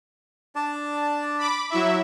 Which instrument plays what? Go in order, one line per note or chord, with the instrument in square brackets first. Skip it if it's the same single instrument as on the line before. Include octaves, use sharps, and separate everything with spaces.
[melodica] D4 D5 A5
[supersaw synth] B5 D6
F#3 E4 E5